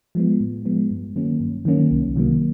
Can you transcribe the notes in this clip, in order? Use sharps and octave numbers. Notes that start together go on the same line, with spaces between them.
F3 G#3 B3
A2
F3 G#3 B3
G2
D#3 F#3 A#3 C#4
G2
D#3 F#3 A#3 C#4
C2
C3 D#3 F#3 A#3